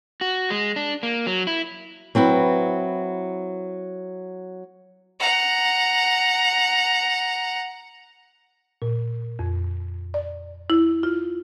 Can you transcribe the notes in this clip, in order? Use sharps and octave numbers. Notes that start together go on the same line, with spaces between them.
F#4
G#3
D4
A#3
F#3
E4
F#3 C4 E4 B4
F#5 A#5
A#2
F2
D5
E4
F4